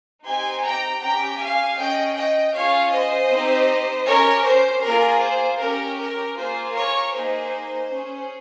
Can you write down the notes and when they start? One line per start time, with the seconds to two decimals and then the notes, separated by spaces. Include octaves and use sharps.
0.24 C4 D#4 G4 G#5 C6
0.62 G5 A#5
1.00 C#4 G4 G5 A#5
1.39 F5 G#5
1.77 C#4 G#4 D#5 G5
2.16 D#5 G5
2.53 C#4 F4 G#4 C#5 F5
2.92 C5 D#5
3.31 C4 D#4 G4
4.07 C#4 G4 A#4 C#5
4.45 C5
4.83 A#3 F4 G#4 A#4
5.21 C5
5.60 C#4 G4 A#4
5.98 A#4
6.36 A#3 F4 G#4 C5
6.74 A#4 C#5
7.12 A#3 D#4 G#4 C5
7.89 C#4 G#4